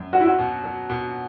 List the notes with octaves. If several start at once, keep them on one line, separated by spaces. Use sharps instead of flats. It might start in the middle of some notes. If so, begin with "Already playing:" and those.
Already playing: F#2
F#3 F#4
E4
F#4
B2
F#3
B2